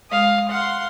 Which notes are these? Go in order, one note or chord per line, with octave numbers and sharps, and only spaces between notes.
G#3 F5 D#6
F5 F#5 C6